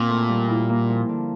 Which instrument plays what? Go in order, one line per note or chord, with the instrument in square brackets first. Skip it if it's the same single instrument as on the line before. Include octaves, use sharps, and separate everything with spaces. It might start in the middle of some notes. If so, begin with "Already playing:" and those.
Already playing: [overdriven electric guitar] A#2 [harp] C4
[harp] A2
G3
E4
A#3
F3
D3